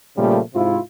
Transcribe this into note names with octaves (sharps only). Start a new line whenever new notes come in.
A#2 C#3 F3 G3 A3 A#3
G#2 C3 E4 F4